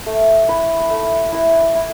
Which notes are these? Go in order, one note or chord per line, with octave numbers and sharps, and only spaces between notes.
A3
E4 B4
A3
E4 B4
E4